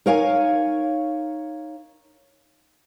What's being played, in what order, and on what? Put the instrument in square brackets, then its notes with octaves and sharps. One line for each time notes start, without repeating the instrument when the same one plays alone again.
[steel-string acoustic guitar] D#4 A#4 C#5 F5 G#5